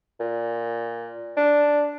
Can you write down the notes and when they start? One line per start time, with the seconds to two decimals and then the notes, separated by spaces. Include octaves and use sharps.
0.20 A#2
1.37 D4